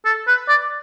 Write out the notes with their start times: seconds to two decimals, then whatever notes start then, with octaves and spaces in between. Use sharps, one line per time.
0.05 A4
0.27 B4
0.49 D5